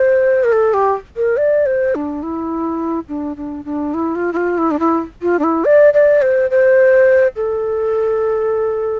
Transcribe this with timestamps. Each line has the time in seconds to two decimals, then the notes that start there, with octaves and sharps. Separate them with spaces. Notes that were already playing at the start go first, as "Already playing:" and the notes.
Already playing: C5
0.44 A#4
0.52 A4
0.74 G4
1.16 A#4
1.37 D5
1.66 C5
1.95 D4
2.23 E4
3.08 D4
3.37 D4
3.65 D4
3.94 E4
4.15 F4
4.33 E4
4.37 F4
4.58 E4
4.71 D4
4.79 E4
5.22 F4
5.39 D4
5.44 E4
5.65 D5
5.94 D5
6.22 C5
6.50 C5
7.36 A4